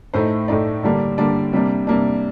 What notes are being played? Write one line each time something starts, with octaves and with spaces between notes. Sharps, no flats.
A2 A3 D#4 C5
A2 A3 D#4 D5
D3 G3 A#3 D4
D3 G3 A#3 D4 D5
C3 G3 A#3 D4
C3 G3 A#3 D4